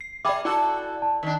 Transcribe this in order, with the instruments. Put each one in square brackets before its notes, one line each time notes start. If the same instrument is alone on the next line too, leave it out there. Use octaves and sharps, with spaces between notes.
[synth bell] C7
[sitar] G#4 [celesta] D5 D6 [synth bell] E5 G5 B5
[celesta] E4 [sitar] F#4 A4 [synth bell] D5
[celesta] A5
[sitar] D#3 D4